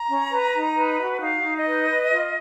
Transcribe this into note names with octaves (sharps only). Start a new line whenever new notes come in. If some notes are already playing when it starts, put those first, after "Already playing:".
Already playing: A#5
C#4
B4
D#4
B4
F#4
D#4 F5
D#4
D#5
B4
B4
F4